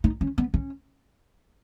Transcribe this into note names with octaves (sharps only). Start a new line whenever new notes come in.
D#4
C#4
B3
C#4